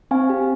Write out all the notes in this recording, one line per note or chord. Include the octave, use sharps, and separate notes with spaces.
C4 F5 G#5
G4